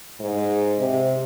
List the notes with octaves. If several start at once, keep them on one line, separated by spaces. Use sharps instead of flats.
G#2
C3